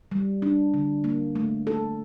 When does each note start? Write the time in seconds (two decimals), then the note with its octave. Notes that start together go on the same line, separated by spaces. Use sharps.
0.11 G3
0.42 D4
0.74 D3
1.04 A#3
1.35 A3
1.67 A4